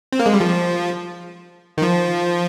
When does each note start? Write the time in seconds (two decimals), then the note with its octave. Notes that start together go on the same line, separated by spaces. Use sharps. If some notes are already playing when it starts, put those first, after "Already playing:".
0.12 C4
0.19 A#3
0.26 G#3
0.34 G3
0.40 F3
1.78 D#3
1.82 F3